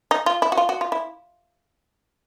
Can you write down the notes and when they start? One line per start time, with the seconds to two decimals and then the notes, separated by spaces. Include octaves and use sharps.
0.11 D#4
0.26 F4
0.42 E4
0.52 F#4
0.57 F4
0.69 F#4
0.81 F4
0.92 E4